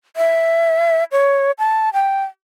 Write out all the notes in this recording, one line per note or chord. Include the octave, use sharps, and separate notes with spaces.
E5
C#5
A5
G5